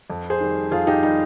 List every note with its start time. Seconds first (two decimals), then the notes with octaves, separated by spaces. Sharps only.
0.10 F2
0.30 G#4 C5
0.40 D#3 G3
0.71 F2 F4 G#4
0.87 D#4 G4
1.02 D#3 G3 D#4